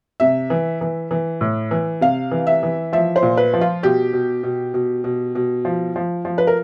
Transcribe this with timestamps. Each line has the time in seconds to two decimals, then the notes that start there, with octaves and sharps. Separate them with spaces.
0.20 C3 E5
0.50 E3
0.81 E3
1.11 E3
1.41 A2
1.71 E3
2.01 C3 F5
2.31 E3
2.47 E5
2.63 E3
2.93 F3 E5
3.16 C5
3.23 A#2
3.37 B4
3.53 F3
3.61 F4
3.83 B2 G4
4.13 B2
4.43 B2
4.74 B2
5.04 B2
5.35 B2
5.65 F3
5.96 F3
6.25 F3
6.38 B4
6.47 A#4